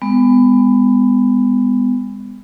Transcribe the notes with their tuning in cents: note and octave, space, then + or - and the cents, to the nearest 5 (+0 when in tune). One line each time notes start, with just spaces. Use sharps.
G#3 -30 B3 +20